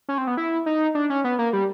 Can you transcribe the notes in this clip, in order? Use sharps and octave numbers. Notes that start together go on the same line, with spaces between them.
C#4
C4
B3
E4
D#4
D4
C#4
B3
A#3
G3